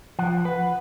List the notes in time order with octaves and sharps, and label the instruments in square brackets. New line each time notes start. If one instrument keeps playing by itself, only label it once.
[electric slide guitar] F3 [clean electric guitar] F#5
[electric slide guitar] B4